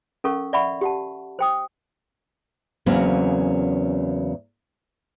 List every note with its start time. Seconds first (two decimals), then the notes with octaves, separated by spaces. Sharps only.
0.24 C#4 A4 A#4 F5 C#6
0.53 D5 E5 F#5 B5 C#6
0.81 G4 F#5 A5
1.39 C5 G5 D#6
2.86 E2 C#3 F#3 A#3 C4 C#4